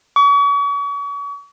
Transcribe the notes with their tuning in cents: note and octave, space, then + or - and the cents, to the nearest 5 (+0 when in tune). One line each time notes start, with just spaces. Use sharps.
C#6 +40